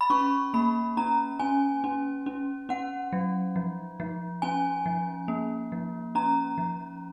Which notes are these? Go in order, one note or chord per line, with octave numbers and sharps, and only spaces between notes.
B5
C#4 C#6
A#3 B5
C#4 A#5
C#4 G#5
C#4
C#4
C#4 F#5
F#3
F3
F3
C#4 G#5
F3
A#3
F3
C#4 A#5
F3